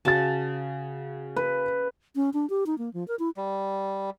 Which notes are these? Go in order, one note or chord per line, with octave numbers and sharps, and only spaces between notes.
C#3 F#4 A5 A6
B4
C#4
D4
G4
D#4
A#3
F3
A#4
E4
G3